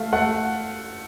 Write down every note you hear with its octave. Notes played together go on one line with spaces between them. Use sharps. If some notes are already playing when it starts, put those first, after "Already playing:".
Already playing: A3 F5
A3 F#5